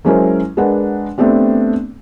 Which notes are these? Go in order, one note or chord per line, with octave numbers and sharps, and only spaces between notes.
F#3 G#3 C#4 E4 A#4 C5
G#3 D4 A#4 B4 F#5
A3 B3 C4 D4 G4